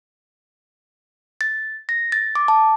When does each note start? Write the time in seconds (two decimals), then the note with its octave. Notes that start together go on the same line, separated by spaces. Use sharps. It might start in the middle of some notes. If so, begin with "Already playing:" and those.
1.41 A6
1.89 A#6
2.12 A6
2.35 D6
2.48 A5